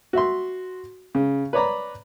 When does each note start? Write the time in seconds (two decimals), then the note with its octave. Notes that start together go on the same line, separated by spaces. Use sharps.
0.13 F#4 E5 C6
1.15 C#3
1.53 B4 C#5 D5 A#5 B5